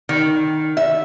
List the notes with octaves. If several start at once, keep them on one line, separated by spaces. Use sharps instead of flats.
D#3
E5